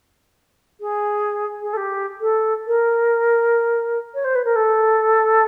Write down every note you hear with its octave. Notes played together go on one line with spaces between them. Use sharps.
G#4
G#4
A4
G4
A4
A#4
C#5
C5
B4
A#4
A4